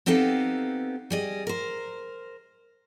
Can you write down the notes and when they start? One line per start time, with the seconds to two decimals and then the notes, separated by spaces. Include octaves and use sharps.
0.06 B3 C4 D#4 G4 A4 F5
1.10 G3 G#4 D#5
1.47 A#4 C5